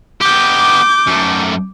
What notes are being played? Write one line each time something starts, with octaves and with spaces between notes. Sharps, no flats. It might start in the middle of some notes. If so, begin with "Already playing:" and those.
B3 G4 D6 G6
F#2 A3